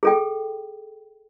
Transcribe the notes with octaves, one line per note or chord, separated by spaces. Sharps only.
G#4 A4 G5